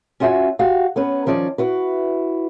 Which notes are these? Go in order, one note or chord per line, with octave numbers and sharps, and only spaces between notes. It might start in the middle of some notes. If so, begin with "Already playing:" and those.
C#4 F4 F#4 D#5 E5 G#5
F#4 G4 F5
B3 C#4 B4
D#3 F3 C#4 D5 D#5
E4 F#4 B4